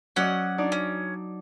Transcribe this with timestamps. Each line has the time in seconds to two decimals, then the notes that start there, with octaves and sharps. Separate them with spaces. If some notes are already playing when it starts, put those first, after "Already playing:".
0.16 F#3 C#4 D5 D#5 F#5
0.58 D4 D#4 D5
0.72 C#4